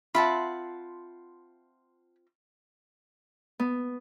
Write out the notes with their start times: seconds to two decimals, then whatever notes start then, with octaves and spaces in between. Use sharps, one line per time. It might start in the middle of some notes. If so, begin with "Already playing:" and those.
0.15 C4 F4 E5 F#5 A5 B5
3.59 B3